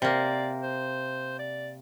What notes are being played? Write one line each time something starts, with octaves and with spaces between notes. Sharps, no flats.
C3 A#3 D5
C5
D5